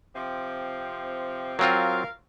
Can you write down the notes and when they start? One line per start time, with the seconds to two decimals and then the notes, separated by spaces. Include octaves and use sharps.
0.15 C3 F3 C4
1.59 F#3 C4 F4 A#4 F5